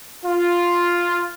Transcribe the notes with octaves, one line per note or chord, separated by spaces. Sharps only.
F4